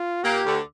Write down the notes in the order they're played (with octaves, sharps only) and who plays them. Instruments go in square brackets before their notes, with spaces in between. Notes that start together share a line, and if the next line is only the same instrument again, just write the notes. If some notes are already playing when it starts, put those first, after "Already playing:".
Already playing: [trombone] F4
[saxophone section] A#2 A#3 [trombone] G4
[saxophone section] D2 D3